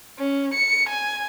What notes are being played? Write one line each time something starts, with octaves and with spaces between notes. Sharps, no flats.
C#4
C#7
G#5